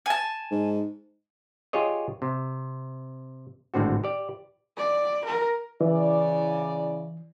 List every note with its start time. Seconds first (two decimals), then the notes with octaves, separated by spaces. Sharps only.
0.06 G#5 A5
0.51 G#2
1.73 F4 G4 G#4 C#5 D#5
2.22 C3
3.74 G#1 A2 D3 C4 F#4
4.04 G4 D5
4.77 D5
5.25 A#4
5.81 C#3 E3 E4 D5